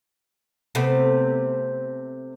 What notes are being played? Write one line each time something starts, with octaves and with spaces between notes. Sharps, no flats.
C3 A3 B3